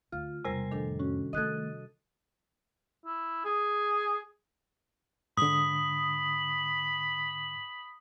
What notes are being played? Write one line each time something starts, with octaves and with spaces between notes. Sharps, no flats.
D2 F4
E1 C3 G3 A#4 C5 G#5
F2 A2 D#3 D4 A4
C#4 F#4
D#3 A3 A4 D#5 D#6 F#6 G#6
E4
G#4
G#2 D3 B5 D#6